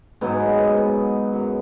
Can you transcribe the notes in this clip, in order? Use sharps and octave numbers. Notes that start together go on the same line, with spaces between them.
G#2 F#3 B3
B3
B3
B3
F#2 F#3